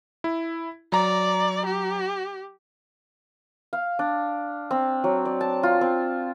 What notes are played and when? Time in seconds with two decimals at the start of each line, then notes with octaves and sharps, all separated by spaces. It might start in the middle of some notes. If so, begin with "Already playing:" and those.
0.24 E4
0.92 F#3 D5 A#5
1.66 G4
3.73 F5
3.99 D4
4.71 C4
5.04 F#3
5.25 D5
5.41 A5
5.63 F4
5.81 C4